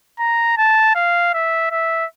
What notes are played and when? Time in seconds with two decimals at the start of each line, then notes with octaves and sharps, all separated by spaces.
0.19 A#5
0.57 A5
0.95 F5
1.34 E5
1.71 E5